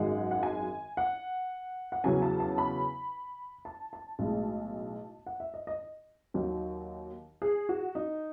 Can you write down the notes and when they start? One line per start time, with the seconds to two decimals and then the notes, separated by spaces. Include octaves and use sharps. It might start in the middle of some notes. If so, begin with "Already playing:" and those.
Already playing: G#1 F#2 D#3 G#3 F#5
0.31 F#5
0.43 G#5
0.97 F#5
1.92 F#5
2.04 E2 C#3 F#3 G#5
2.22 A5
2.40 A5
2.58 B5
3.65 A5
3.93 A5
4.19 B1 A2 G#3
5.27 F#5
5.40 E5
5.54 D#5
5.67 D#5
6.34 D#2 D#3 F#3
7.42 G#4
7.69 F#4
7.95 D#4